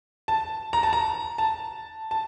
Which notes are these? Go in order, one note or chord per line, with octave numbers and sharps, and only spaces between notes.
A5
A#5
A5
A#5
A5
A5